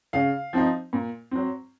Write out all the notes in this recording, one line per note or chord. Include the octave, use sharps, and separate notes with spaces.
C#3 F5
F3 C4 D#4
A#2
F#3 C4